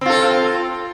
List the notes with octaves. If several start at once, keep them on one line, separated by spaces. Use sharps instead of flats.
C4 F4 A4